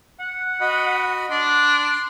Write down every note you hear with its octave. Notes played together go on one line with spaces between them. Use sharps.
F#5
F#4 D#5 B5
D4 C6